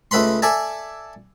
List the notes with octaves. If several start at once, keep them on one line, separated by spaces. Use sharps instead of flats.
C#2 A3 B4 B5 C6
A4 D5 E5 G#5 A5